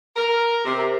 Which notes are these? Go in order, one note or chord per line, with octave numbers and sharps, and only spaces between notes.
A#4
C3